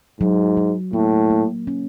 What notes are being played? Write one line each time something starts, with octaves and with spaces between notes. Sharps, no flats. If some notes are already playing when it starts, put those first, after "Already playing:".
G#2 F#3
F#3
A2 A#3
A#3
C#4